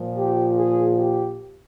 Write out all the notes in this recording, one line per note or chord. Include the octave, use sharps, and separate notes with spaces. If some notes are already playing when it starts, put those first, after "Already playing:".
Already playing: A#2 F3
G4
G#4
G4